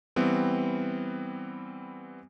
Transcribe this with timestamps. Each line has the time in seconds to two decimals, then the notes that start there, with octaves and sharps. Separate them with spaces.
0.16 E3 G3 B3 C4